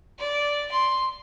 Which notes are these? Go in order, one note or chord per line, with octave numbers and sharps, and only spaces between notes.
D5
C6